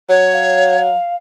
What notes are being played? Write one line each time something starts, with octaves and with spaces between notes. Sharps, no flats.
F#3 C#5
F5